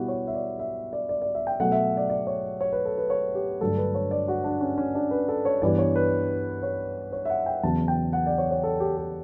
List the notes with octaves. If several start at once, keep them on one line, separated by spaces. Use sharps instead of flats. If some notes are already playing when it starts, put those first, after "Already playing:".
Already playing: B2 G3 B3 E4 F#4 G4
C#5
E5
D5
E5
D5
D5
D5
E5
G5
B2 F#3 A3 F#5
E5
D5
D5
C#5
C#5
B4
A4
B4
C#5
G4
G2 D3 F#3 A3 A4
B4
C#5
D5
F#4
D4
C#4
C#4
D4
B4
A4
C#5
G2 E3 G3 B3 D5
C#5
B4
C#5
C#5
E5
F#5
G5
E2 C#3 F#3 B3 A5
G5
F#5
D5
C#5
C#5
A4
G4
G4